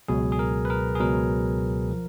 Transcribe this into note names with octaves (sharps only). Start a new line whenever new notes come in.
C#2 B2 F#3 G#4
G#4
A#4
B4
A#4
G#4
C#2 B2 F#3 A#4
F3